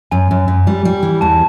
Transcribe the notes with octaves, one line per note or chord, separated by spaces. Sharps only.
F#2 G#5
F#2
F#2
G3
G3
E3
E2 A5